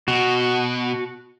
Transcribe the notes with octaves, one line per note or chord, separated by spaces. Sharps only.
B2 F#4